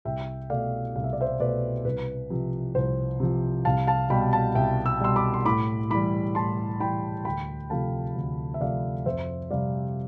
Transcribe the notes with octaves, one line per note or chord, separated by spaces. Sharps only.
C2 E5 G5
B2 A3 D5 F5
C2 F5
E5
D5
C5 E5
B2 A3 B4 D5
C2 B4
C3 F3
C2 C5
C3 F3
C2 F5 A5
F5 A5
B2 G3 G5 B5
F5 A5
C2 E5 G5
E6
B2 G3 C6 E6
B5 D6
C6
A2 B5 D6
E3 G3 B5 D6
A2 A5 C6
E3 G3 G5 B5
D2 G5 B5
C3 F3 A3 F5 A5
D2
E5
C3 F3 A3 D5 F5
F2 C5 E5
C3 G3 D5 F5